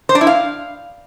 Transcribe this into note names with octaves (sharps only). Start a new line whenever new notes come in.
C5
D4
E4
F5